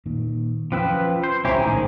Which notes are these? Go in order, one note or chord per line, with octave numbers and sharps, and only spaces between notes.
A#2 D#3
F3 F#3 C#4 B4 G5 E6
C5
C#2 C#4 E4 G4 C5 A#5
A#1 A2 D#3 G#4